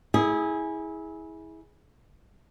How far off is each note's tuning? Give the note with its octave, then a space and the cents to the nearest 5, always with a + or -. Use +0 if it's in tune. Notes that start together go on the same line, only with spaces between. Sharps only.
E4 -25 G#4 +0